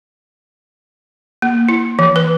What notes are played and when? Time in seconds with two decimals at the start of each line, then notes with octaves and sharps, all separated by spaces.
1.42 A#3
1.69 E4
1.99 E3
2.16 B4